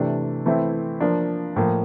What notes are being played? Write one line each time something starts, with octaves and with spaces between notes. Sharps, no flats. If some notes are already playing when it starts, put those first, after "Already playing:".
Already playing: C3 E3 A3 D4
E3 A3 C4 E4
F3 A#3 D4
A2 F3 A#3